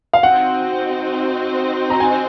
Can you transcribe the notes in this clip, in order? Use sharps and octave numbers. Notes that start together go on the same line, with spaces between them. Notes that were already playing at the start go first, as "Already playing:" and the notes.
F5
C4 D#4 F#4 C5 D#5 F#5
A#5
G#5